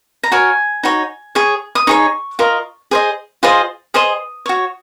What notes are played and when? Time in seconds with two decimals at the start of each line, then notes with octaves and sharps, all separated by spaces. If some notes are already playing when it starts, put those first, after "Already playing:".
0.23 A#5
0.32 F#4 A#4 C#5 G#5
0.83 D#4 F#4 C#5
1.35 G#4 C#5
1.75 D#6
1.87 D#4 G#4 C#5 C#6
2.39 F4 A#4 D#5
2.91 G#4 C5 D#5
3.43 F4 G#4 C5 D#5
3.94 G#4 C5 D#5 D#6
4.46 F#4 C#5